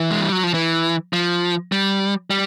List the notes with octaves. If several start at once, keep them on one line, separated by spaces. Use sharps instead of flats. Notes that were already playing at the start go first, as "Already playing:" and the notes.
Already playing: E3
G#3
G3
F#3
F3
E3
F3
G3
G3